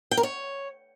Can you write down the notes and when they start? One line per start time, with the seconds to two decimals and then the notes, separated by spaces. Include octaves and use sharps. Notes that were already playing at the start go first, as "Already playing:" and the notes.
0.11 G5
0.17 A#4
0.23 C#5